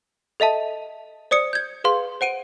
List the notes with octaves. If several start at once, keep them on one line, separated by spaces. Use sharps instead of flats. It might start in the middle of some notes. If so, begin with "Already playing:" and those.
A4 D#5 E5 A5
C5 D5 D#6 C#7
G6 G#6
G#4 B4 F5 C6
C5 F#5 D7 D#7